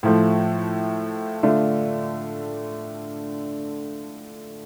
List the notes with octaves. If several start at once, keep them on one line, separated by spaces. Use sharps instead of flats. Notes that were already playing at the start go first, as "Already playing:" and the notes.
A2 F3 A3
D3 A3 D4 F4